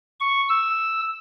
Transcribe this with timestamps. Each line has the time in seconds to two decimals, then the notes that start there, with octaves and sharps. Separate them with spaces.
0.20 C#6
0.49 E6